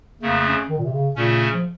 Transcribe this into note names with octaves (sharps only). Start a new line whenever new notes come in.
F2 C#3 A3 A#3
C#4
D#3
A#2
C3
C#3
A#2 C#3 A3 C#4
F3